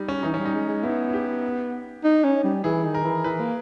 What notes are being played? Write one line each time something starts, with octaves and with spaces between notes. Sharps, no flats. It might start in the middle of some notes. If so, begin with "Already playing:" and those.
Already playing: G3 D#4
C#4
E3 D#4
G3 C#4
D#4
G#3
G#3
B3 E4
E4
G4
D#4
C#4
G3
E3 G#4
D#3
A#4
E3
E3 B4
A#3